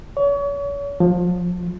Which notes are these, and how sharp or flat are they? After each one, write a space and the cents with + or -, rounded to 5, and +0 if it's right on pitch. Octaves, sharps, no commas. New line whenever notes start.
C#5 +35
F3 +30